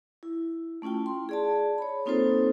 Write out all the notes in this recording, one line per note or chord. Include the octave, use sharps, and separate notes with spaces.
E4
A3 C#4 E4 F4 G5
C6
G#4 D5 A5
C#5 B5
A#3 C4 D#4 F4 A4 C5